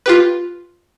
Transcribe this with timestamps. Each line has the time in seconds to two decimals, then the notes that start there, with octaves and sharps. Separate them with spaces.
0.06 F4 G4 B4